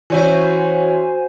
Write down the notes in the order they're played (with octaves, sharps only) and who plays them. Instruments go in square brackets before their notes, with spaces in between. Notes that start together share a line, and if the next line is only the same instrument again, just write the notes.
[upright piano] E3 C#4 E4 [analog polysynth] F#4 C5 G#5